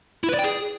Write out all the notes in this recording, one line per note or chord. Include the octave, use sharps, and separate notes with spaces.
E4
B4
D5
G5
G#4